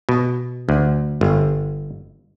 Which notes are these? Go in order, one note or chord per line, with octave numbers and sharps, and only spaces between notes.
B2
D2
G1